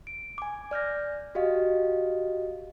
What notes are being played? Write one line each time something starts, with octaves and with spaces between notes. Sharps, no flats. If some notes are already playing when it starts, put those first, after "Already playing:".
D7
G#5 D6
D5 F6 G6 A#6
F#4 G4 D#5 F5